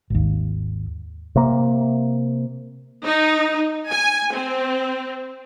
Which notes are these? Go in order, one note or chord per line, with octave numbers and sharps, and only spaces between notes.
G#1 D#2
C3 A#3
D#4
G#5
C4